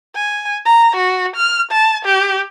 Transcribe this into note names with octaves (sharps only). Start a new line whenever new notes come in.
G#5
A#5
F#4
F6
A5
G4